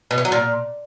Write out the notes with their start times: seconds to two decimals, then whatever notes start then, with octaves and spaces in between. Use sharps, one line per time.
0.11 B2
0.18 E3
0.25 F#3
0.32 A#2